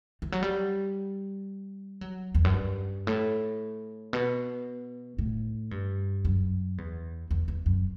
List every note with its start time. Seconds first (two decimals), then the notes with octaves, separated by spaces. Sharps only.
0.22 E3
0.32 F#3
0.43 G3
2.01 F#3
2.35 E2
2.44 F#2
2.54 G2
3.07 A2
4.13 B2
5.19 A2
5.71 G2
6.25 F#2
6.78 E2
7.31 E2
7.48 E2
7.66 F#2